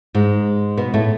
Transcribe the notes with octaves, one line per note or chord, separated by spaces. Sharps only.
G#2 G#3
B2 B3
A2 A3